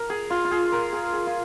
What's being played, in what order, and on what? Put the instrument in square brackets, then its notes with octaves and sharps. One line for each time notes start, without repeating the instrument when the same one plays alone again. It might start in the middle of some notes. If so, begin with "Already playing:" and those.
Already playing: [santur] A#4
G#4
F4
F4
G#4
A#4
G#4
G#4
F4